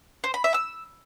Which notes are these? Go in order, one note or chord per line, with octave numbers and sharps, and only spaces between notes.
C5
B5
E5
E6